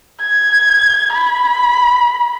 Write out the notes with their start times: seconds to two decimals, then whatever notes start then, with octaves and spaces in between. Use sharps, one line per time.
0.21 G#6
1.13 B5